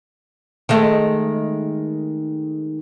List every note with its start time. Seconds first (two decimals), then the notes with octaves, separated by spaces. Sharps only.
0.69 D#3 G#3 A3